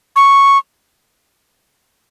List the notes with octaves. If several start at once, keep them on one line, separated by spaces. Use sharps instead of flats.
C#6